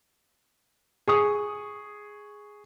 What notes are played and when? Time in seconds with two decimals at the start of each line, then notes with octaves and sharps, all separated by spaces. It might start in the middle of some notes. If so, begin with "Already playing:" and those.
1.08 G#4 C#6 D#6